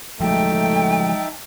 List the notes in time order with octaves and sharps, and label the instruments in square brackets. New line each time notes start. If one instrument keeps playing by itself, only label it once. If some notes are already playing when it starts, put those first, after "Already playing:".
[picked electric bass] F3 F#3 G#3 [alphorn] A3 [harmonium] D#4 E5 A5 [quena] G5